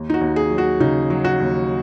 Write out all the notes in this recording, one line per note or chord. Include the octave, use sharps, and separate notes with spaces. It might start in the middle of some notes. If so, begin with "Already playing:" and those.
Already playing: D#2
D#4
F#4
D#2
G#4
F#3
F#4
C#3 D#4
F#3
F#4
D#2